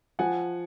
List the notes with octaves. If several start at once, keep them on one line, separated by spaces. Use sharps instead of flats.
F3 F#5 G#5